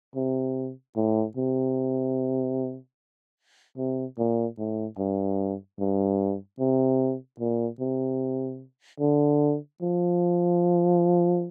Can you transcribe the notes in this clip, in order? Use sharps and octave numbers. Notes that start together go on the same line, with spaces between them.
C3
A2
C3
C3
A#2
A2
G2
G2
C3
A#2
C3
D3
F3